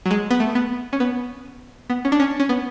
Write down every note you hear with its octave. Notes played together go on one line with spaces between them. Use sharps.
F#3
G#3
B3
A3
B3
C#4
B3
B3
C#4
D4
C#4
C#4
B3